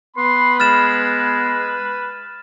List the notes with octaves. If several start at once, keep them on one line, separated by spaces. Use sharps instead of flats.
B3 B4 B5 C6
G#3 F6 A6 E7